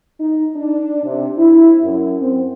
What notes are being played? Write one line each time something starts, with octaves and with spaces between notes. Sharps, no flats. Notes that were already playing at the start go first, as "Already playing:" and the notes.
D#4
D4
C3
E4
F#2
C4